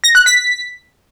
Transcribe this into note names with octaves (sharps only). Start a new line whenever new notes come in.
A#6
F#6
B6